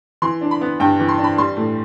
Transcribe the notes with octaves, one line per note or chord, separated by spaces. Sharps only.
E3 C6
D4
B5
B3
G2 G5
E3
C6
D4
B5
G3 C6
A2